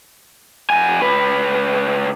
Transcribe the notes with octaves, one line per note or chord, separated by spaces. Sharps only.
F2 G#5
C#2 B4